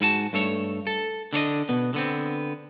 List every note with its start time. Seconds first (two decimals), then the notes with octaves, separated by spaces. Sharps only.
0.01 G#2 E4 F#4 A5
0.33 G2 A3 A4 C#5
0.87 A4
1.33 D3 D4 C#5 D#5
1.69 B2 B3
1.94 D3 B3 C4